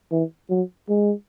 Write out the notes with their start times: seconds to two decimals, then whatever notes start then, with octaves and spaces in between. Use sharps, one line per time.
0.11 E3
0.50 F#3
0.89 G#3